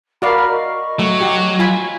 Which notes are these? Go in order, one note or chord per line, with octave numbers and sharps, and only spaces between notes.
F#4 A#4 D5 F5 B5 F6
D#5 C#6
F#3 A3
F#4 G4
F4 G#5 B5